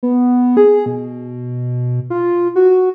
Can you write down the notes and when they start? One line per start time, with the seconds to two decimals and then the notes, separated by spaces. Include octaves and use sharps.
0.03 B3
0.57 G#4
0.86 B2
2.10 F4
2.56 F#4